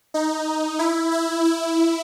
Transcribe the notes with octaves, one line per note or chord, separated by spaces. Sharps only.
D#4
E4
E4
E4